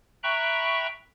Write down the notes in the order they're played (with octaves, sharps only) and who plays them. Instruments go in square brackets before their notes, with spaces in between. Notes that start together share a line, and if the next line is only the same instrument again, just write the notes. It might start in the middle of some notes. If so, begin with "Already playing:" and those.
[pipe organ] E5 G5 A#5 B5 C#6 F#6